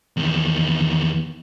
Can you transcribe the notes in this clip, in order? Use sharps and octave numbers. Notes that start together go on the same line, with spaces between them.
E2 D#3